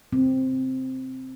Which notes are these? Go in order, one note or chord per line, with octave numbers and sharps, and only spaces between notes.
C4